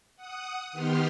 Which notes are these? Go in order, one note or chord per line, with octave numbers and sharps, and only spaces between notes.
F#5 D#6
D#3 B3 G4 C6 F6